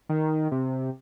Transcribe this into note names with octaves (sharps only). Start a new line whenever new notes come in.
D#3
C3